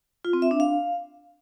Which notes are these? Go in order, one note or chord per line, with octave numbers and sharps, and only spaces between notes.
F4
C4
E5
D4
F5